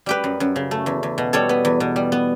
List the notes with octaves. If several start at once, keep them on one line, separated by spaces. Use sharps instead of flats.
G3 G4 B4
F#2
F#2
C#3
A3
E2
E2
B2
G3 A4 C#5
B3
E2
B2
G3
B3